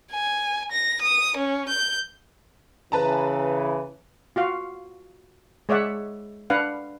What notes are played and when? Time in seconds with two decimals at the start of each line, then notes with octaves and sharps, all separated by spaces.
0.11 G#5
0.72 A#6
1.02 D#6
1.37 C#4
1.69 G6
2.92 C#3 E3 B4 A5 A#5
4.36 F4 F#4 F5
5.69 G#3 C#5 D5 E5 F#5
6.50 D4 B4 F5 F#5